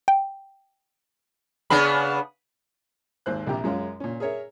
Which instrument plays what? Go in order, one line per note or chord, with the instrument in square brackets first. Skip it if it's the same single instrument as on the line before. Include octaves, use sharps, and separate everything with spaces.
[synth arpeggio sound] G5
[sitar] C#3 B3 D4 [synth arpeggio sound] B5
[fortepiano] G#1 D#2 C5 F#6
A#1 C3 G4 A#5
F#2 G#3 C#4 F4
A#2 C#4
G#4 A#4 C#5 E5